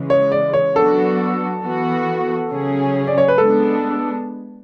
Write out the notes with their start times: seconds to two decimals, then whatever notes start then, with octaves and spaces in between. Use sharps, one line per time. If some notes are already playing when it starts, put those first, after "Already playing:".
Already playing: C#3 E3 G#3
0.10 C#5
0.32 D5
0.53 C#5
0.75 F#3 B3 D4 F#4 A4
1.64 E3 B3 F#4
2.51 C#3 F#3 C#4 G#4
3.07 D5
3.18 C#5
3.28 B4
3.38 G#3 B3 D4 A4